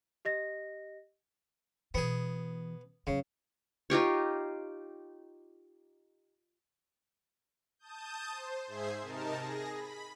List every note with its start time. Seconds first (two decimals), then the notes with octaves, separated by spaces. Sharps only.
0.25 G4 D#5 A#6
1.94 B2 E3 B3 G#4
3.07 F#2 C#3 F#3
3.90 D#4 F4 G4 C#5
7.79 A5 D#6 G6
8.29 C5
8.67 G#2 G#4 C5 E5 G#6 C7
9.01 C3 D#4 A#4 A5
9.36 G#4 A#6
9.73 B5